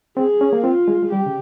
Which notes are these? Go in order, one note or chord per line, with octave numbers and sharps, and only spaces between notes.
C4 G#4
C#4
A#3
C4 F4
G#3
G#3
G3 G4
C#3